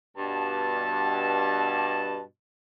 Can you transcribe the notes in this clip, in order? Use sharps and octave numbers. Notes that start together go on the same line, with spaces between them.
G2 B2 A5